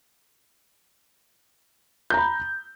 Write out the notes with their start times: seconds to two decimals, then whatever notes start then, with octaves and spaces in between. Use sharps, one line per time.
2.10 G6
2.14 A#5
2.17 B5